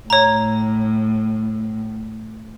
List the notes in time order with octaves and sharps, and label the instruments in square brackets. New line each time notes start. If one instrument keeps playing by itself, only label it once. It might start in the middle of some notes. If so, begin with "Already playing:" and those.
[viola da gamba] A2 [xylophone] C#5 A#5